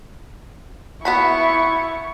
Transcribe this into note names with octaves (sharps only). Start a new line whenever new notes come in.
B3 E4 F#4 B5 C#6